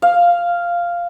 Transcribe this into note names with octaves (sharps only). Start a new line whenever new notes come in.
F5